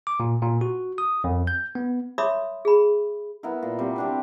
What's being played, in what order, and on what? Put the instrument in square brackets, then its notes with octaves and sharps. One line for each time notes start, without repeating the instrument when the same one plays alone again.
[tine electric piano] D6
A#2
A#2
F#4
D#6
F2
G6
B3
[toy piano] C#5 E5 B5 C6 D6 D#6
G#4 B5
[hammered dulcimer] B3 E4 A#4
A#2
C3 G3
C4 D4 G4